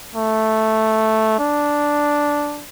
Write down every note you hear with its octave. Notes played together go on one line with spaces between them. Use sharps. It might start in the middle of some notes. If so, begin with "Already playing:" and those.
A3
D4